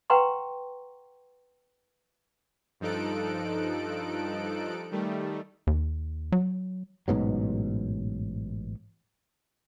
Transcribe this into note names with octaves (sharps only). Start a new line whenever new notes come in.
B4 F#5 G5 A#5 C6 C#6
G2 F3 D#4 A4 F#6 D7
D#3 G3 A3
D#2
F#3
A1 G#2 B2 F#3